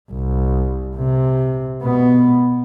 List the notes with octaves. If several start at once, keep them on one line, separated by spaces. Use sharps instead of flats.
C2
C3
B2 B3